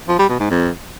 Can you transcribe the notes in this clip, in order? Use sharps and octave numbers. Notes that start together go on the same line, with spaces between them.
F3
G3
B2
G#2
F2